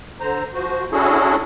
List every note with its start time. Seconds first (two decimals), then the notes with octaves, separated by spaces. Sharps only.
0.21 D3 C5 A#5
0.54 F3 F#4 C5
0.92 C#4 D4 E4 F#4 G#4 A4